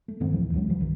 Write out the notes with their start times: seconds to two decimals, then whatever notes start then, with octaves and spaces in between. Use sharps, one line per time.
0.08 A3
0.20 G2 D#3 A3 C4
0.32 D1 A#1 E3 F3
0.53 C#2 F#3 G#3 C#4
0.66 E3 F#3 G3
0.80 G1 C2 D#3